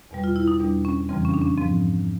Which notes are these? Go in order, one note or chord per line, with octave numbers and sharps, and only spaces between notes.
E2 B2 G3
F4
E4
D#4
E2 B2 G3 D4
C#4
F2 C#3 E3 G3 C4
C#4
D4
C#4
G#2 F3 C4